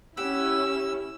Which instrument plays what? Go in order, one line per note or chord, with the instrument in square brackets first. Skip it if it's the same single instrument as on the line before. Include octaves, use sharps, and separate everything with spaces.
[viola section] C#4 E4 [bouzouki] G4 F#5 [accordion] E6